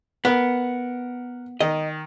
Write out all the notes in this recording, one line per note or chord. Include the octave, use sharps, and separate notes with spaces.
B3 A#4 F#5
D#3 D#5